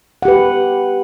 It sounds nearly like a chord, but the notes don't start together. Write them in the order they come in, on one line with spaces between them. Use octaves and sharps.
F#5 G4 B4